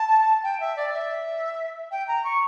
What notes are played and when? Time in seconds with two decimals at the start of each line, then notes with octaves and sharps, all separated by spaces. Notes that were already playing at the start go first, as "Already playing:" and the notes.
Already playing: A5
0.43 G5
0.60 E5
0.76 D5
0.93 E5
1.91 G5
2.08 A#5
2.24 C#6